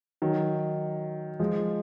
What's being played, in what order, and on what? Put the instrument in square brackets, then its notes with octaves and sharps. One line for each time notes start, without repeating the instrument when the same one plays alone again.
[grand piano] D#3 F#3
F3 G#3